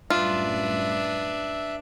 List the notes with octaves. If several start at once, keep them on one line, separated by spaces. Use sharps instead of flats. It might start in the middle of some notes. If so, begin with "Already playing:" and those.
F#2 A2 G3 D4 F4 B4 E5